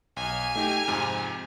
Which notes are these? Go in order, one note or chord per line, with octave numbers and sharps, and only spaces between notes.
B1 G#5 F6
A3 D#4 G4
F2 G#2 C3